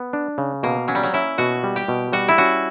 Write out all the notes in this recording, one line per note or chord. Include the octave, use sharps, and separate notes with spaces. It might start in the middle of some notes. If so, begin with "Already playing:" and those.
Already playing: B3
D4
C#3
B2 A#3
F#3 C#4
G3
F#3
C#4 E4
B2 F#4
G3
G4
B2
G3 F#4
E4
C#4 F#4